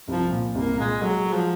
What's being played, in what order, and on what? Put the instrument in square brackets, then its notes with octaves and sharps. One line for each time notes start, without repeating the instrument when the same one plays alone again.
[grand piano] C2 [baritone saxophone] F3
[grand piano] A#2
[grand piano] C2 [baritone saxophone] A#3
[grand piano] A#2 [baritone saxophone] G#3
[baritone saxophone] F#3 [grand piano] G#3
[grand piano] G#3
[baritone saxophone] F3